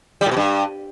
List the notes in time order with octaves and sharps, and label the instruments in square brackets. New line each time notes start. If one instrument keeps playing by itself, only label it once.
[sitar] G3
A2
B2
G2